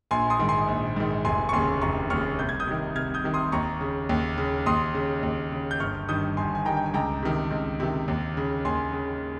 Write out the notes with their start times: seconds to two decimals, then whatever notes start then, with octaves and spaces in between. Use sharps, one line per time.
0.11 A#1 G#5 C6
0.30 C6 D#6
0.39 G#2 D#3
0.49 G#5 C6
0.68 A#1
0.96 G#2 D#3
1.25 F1 G#5 C6
1.49 C#6
1.53 D#2 C#3 G#5 C6
1.81 F1 A#5 C#6
2.10 D#2 C#3 C#6 F6
2.39 C2 G6
2.49 G#6
2.60 D#6 G6
2.67 C3 D#3
2.96 C2 F6 G#6
3.14 D#6 G6
3.24 C3 D#3
3.34 C6 D#6
3.52 D#2 A#5 C#6
3.81 C#3
4.09 D#2
4.38 C#3
4.66 D#2 C6 D#6
4.94 C#3
5.23 D#2
5.52 C#3
5.71 G6
5.80 G1 C#6 F6
6.09 G2 D#3 D#6 G6
6.37 G1 G#5 C6
6.55 G#5
6.65 D#3 G5 A#5
6.69 G2
6.77 G5
6.86 G#5
6.94 C#2 G5 A#5
7.23 C3 D#3
7.51 C#2
7.80 C3 D#3
8.08 D#2
8.37 C#3
8.65 D#2 G#5 C6
8.93 C#3